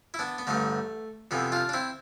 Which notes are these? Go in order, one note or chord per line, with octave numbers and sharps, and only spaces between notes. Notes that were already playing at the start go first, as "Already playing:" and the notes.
E4
B3 D4
B3
A1 G2 D3 A3
F2 C3 E3 B3
D4 F4
D4
C4 E4